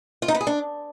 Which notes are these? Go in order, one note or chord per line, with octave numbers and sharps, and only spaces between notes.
F4
D#4
B3
G#4
D4